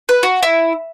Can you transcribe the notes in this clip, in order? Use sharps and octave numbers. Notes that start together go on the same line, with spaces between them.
B4
F#4
E4